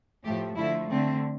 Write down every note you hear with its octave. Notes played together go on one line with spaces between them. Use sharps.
A2 F3 A3 G4
D3 F3 A3 E4
D3 A3 C4